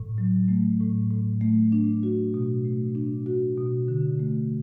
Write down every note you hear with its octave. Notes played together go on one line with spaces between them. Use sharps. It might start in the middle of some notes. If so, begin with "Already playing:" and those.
Already playing: A2
F#3
A3
A2
A2
A3
D4
F#4
B2
A3
D4
F#4
B2
D3
A3